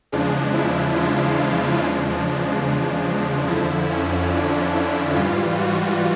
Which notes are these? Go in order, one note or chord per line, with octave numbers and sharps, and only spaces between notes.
E2 C#3 F3 G#3 D4
E4
F4
D4
E2 C#3 F3 G#3
F2 D3 F3 E4
C#4
D4
E4
G#2 E3 G3 F4
F#4